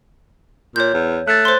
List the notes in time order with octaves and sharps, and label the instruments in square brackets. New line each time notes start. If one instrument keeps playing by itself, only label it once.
[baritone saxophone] A#2 [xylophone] C#5 G6
[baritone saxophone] E2
[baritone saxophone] A3 [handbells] F#6 A6
[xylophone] C5 C6